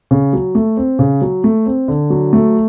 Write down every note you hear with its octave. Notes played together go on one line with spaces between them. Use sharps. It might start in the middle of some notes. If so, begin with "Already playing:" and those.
C#3
F#3
A3
C4
C#3
F#3
A3
C4
D3
F#3
A3